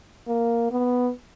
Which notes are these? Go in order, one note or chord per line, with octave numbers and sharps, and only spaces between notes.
A#3
B3